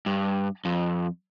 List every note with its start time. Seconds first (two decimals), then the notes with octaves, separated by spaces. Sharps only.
0.06 G2
0.65 F2